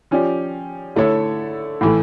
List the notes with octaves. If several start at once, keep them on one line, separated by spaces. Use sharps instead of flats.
F3 C#4 G4 D5
D3 A3 E4 A4 C#5
A2 E3 A3